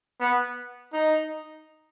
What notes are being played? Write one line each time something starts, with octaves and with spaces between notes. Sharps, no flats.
B3
D#4